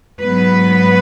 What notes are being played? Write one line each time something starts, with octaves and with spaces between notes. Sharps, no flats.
G#2 F#3 B3 B4